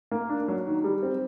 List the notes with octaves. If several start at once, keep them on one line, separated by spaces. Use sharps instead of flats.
A#3
D4
F#3
D#3
G3
C4